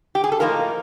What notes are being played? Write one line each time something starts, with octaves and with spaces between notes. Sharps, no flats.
G4
G#4
A4
A2 F3 A#3 D#4 A#4